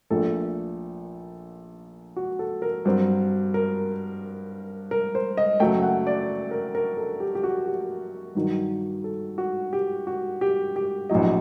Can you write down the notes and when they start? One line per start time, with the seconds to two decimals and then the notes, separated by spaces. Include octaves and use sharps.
0.10 A#1 A#2 A3 A4
2.16 F#4
2.39 A4
2.62 A#4
2.85 G2 F#3 C4
3.54 A#4
4.91 A#4
5.15 C5
5.37 D#5
5.60 F#1 F#2 F#3 A3 G5
5.83 F#5
6.07 D5
6.51 A#4
6.75 A#4
6.97 A4
7.20 G4
7.35 G4
7.44 F#4
7.66 G4
8.35 G2 D#3 F#3
9.04 A4
9.38 F#4
9.73 G4
10.07 F#4
10.41 G4
10.76 G4
11.09 A#1 A2 F#3 D#5